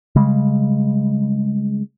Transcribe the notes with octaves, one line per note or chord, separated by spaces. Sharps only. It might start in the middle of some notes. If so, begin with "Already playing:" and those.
C#3 G3 G#3